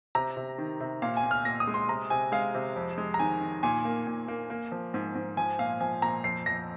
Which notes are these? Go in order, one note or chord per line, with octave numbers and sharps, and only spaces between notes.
C3 A#5
C3
D#3
C3
A#2 F5
G#5
A#2
F6
A#2 A#6
D#6
G#3
C6
C3 A#5
C3 G#5
G#3 F5
C3
F2
G#3
A#5
D#3 G#5
D#3
A#2 G#5
A#3
A#2
A#3
A#3
F3
G#2
G#2
F3 G#5
A#2 F5
F3 G#5
A#2 A#5
F2 C7
F2 A#6